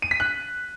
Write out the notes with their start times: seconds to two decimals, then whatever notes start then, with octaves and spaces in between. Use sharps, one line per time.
0.02 D#7
0.11 B6
0.20 F#6